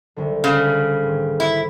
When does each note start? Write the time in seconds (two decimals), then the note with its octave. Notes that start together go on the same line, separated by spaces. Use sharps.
0.16 C2 D3
0.44 C#3
1.03 G#1
1.40 E4